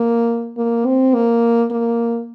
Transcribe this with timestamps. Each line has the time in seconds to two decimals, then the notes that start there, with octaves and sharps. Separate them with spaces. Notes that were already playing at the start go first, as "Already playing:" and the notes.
Already playing: A#3
0.57 A#3
0.86 C4
1.14 A#3
1.71 A#3